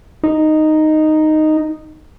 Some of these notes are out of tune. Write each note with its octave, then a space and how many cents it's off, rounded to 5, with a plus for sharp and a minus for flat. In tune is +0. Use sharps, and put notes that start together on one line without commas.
D#4 -5